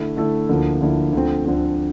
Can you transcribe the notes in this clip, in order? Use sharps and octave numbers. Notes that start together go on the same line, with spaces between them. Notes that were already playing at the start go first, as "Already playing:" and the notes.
Already playing: D3 A3 E4 A4
D3 A3 E4 A4
D2 D3 F3 A#3 E4
D2 D3 F3 A#3 E4
D2 D3 F3 C4
D2 D3 F3 C4